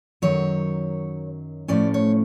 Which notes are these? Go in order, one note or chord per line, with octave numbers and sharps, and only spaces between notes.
F#2 D#3 F#3 C#5
A2 F3 A3 C#4 D5
C#5